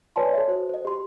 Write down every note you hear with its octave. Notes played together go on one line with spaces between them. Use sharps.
B4 C#5 D5 G#5 A5 C6
A4 C#5 E5
F#4 C5
C5 D#5
G4 C6